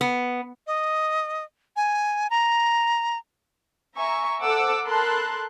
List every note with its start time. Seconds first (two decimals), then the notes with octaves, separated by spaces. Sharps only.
0.01 B3
0.67 D#5
1.76 G#5
2.30 A#5
3.97 E5 G#5 A#5 C#6
4.41 A4 C5 F#5 D6 E6
4.85 A4 A#4 A5 B5 C6 F#6